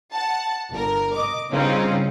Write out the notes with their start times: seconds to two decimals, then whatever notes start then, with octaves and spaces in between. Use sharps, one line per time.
0.15 F#5 A5
0.71 G1 A#4
1.16 D#5 D6
1.50 G2 C#3 C4 C#4 D#4 F4